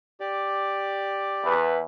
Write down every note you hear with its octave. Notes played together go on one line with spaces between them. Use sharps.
G4 D5
E2 B4